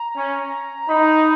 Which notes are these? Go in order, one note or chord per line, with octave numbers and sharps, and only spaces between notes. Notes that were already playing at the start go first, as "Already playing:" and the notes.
Already playing: A#5
C#4
D#4 B5